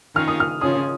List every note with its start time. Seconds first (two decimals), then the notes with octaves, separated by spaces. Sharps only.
0.15 D#3 C#4 F4 G#4 F6
0.28 D#6
0.40 F6
0.61 C#3 F3 C#4 G#4 D#6